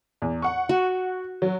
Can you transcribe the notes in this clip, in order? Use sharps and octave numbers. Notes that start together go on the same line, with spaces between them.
E2
F#5 C#6
F#4
F#3